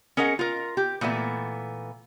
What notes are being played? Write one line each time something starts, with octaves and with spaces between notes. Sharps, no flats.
C#4 G#4 A#4 D#5 F#5
F4 A#4
G4
A#2 E3 A3 B3 E5